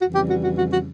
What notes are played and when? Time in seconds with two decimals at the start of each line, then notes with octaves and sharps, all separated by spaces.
0.01 F2 C#3 E3 G3 F#4
0.15 G4
0.30 F#4
0.44 F#4
0.58 F#4
0.73 F#4